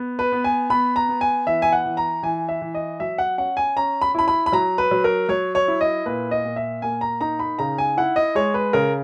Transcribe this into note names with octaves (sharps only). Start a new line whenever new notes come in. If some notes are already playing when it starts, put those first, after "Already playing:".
Already playing: B3
B4
B3
G#5
B3 B5
A#5
B3
G#5
E3 E5
G#5
F#5
E3
A#5
E3 G#5
E5
E3
D#5
F#3 E5
F#5
C#4 F#5
G#5
C#4 A#5
B5
E4 B5
B5
B5
F#3 A#5
B4
F#3
A#4
F#3 C#5
C#5
E4
D#5
A#2 B4
D#5
A#2
E5
A#3 G#5
A#5
D#4 A#5
B5
C#3 A#5
G#5
E4 F#5
D#5
G#3 C#5
B4
C#3 A#4